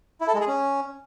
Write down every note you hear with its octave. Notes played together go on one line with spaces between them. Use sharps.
E4
A4
G#3
G#4
C#4